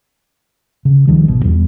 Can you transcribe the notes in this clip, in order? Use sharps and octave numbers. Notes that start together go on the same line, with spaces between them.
C#3
C#2 D#3 F3 G3
G#1 B2
E2 G3 B3